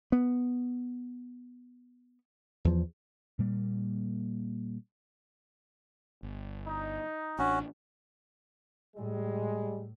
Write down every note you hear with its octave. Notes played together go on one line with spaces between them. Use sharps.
B3
E2 F3
A#2 G3 A#3
G1
D#4
A1 C#4 D4 F#4
A2 G3 G#3